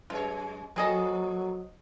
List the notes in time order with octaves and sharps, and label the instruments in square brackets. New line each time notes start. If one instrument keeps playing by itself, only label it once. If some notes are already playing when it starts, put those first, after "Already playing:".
[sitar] F#2 G#3 C#5 [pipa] F4
[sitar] F3 A#3 A4 [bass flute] F#3 [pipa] C4 G#4 D#5